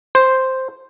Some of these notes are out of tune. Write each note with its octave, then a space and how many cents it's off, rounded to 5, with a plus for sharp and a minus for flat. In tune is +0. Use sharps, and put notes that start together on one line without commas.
C5 +0